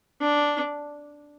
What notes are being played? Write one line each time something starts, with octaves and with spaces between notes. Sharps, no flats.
D4